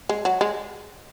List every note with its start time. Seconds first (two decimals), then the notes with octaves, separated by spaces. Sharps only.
0.09 G#3
0.25 F#3
0.41 G#3